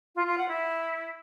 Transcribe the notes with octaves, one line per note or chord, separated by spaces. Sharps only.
F4
F4
F#5
E4